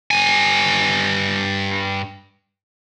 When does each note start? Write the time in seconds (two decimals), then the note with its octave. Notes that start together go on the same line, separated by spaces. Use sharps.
0.11 G2 G#5